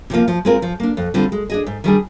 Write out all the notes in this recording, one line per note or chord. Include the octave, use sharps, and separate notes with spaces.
C3 F3 A#3 F4
F3
G#3 C4 F4 A#4
F3
A#3 D4
F2
D3 G3 C4 F4
G#3
D4 G#4 D#5
G#2
D#3 G3 D4 G#4